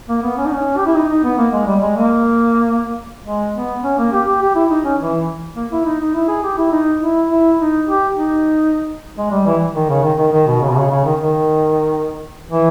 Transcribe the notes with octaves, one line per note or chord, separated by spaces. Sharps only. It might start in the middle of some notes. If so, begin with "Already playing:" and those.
A#3
B3
C#4
D#4
C#4
G4
E4
D#4
D#4
B3
A#3
G#3
G3
G#3
A#3
G#3
B3
C#4
A#3
G4
G4
G4
E4
D#4
C#4
E3
A#3
E4
D#4
D#4
E4
G#4
G4
E4
D#4
E4
E4
D#4
G4
D#4
G#3
G3
E3
D#3
C#3
D#3
D#3
D#3
B2
C#3
B2
C#3
C#3
D#3
D#3
E3